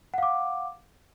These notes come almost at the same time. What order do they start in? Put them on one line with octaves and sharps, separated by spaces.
F#5 F5 D6